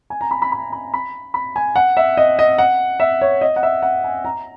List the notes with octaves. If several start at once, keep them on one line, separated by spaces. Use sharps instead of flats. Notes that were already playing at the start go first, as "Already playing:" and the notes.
G#5
A#5
B5
B5
B5
B5
B5
B5
G#5
F#5
E5
D#5
D#5
F#5
E5
C#5
D#5
F#5
E5
F#5
G#5
A#5